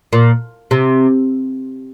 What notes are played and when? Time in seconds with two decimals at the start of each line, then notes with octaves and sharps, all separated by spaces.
0.13 A#2
0.71 C3